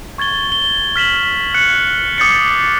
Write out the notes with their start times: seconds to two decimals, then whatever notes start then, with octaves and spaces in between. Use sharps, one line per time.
0.18 C#6 G#6 A6 G7
0.52 G7
0.96 F6 B6 E7 F#7
1.54 F#6 C#7
2.18 D6 D#6 G6 A6 C7 C#7